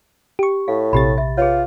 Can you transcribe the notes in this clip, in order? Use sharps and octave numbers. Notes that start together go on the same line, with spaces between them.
G4 C#6
A2 F5
A#1 C3 G4 B5 A6
E5
F4 G#4 B4 C#5